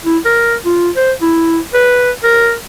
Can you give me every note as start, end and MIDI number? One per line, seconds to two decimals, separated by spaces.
0.06 0.18 64
0.25 0.55 70
0.65 0.90 65
0.96 1.12 72
1.22 1.59 64
1.74 2.11 71
2.24 2.54 70